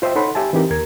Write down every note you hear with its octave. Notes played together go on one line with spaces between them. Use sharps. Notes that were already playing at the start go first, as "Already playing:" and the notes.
F4 C5 D#5 E5 G5
D#4 A4 C#5 F#5 B5 C6
G4 E5 G#5 A5
E3 C4 D#4 G4 A#4
D#2 A#4 G#6